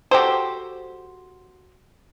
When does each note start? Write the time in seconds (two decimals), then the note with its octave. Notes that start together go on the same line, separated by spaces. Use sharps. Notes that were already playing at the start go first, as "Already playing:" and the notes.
0.11 F#4 G4 A4 C5